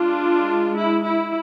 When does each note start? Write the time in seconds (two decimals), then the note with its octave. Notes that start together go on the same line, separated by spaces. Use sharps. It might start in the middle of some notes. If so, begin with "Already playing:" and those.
Already playing: G#3 D4 F4
0.77 E4
1.05 E4